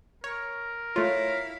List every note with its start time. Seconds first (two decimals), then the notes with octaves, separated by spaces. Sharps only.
0.24 A#4 C#5
0.96 A3 E4 F4 C#5 F5